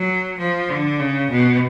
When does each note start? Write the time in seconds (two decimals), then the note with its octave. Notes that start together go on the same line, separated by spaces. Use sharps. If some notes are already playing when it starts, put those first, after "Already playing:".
Already playing: F#3
0.39 F3
0.69 D3
0.99 C#3
1.31 B2